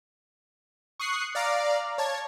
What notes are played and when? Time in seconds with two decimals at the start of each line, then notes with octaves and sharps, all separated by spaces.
1.00 C#6 D#6 F#6 C7
1.35 D5 F5 A#5 D6
1.98 C#5 A5 G#6